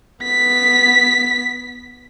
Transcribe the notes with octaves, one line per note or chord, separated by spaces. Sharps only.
B3 B6